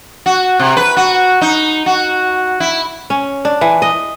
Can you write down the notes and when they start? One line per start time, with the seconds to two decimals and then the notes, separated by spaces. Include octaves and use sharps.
0.26 F#4
0.59 C3
0.77 B4
0.97 F#4
1.41 D#4
1.86 F#4
2.60 E4
3.10 C#4
3.45 D4
3.61 E3
3.82 D#5